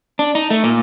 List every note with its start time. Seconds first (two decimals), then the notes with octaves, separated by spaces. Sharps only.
0.19 D4
0.35 D#4
0.50 A3
0.64 A#2